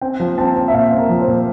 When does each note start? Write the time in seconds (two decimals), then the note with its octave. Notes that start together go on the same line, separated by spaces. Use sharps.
0.01 C4 G5
0.20 F3
0.38 C4 A5
0.56 C4
0.68 E5
0.74 A#2 F5
0.92 C4
0.98 A#4
1.09 F3
1.22 C5
1.28 A#2